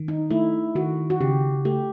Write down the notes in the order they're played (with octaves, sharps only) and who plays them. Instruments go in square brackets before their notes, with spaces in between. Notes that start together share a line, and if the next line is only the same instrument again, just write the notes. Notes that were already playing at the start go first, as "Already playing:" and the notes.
Already playing: [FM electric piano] D#3
[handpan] D#4
[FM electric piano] A3 [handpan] E4
[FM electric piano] D#3 [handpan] F#4
[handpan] F#4
[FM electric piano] C#3 [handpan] G4
[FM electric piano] A3 [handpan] G4